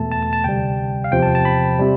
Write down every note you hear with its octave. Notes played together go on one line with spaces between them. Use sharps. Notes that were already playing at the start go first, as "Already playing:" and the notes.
Already playing: E2 B2 A3 A5
A5
A5
A5
D2 C3 G3 G5
F5
E2 C3 F3 G5
A5
A5
B5
C3 G3